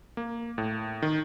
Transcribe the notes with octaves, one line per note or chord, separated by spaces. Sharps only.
A#3
A2
D#3